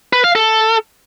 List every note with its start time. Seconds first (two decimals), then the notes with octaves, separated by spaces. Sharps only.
0.13 B4
0.24 F5
0.35 A4